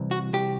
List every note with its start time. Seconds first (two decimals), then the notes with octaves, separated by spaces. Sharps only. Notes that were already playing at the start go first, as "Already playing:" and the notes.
Already playing: C2 E3
0.11 F#4
0.33 C2 G4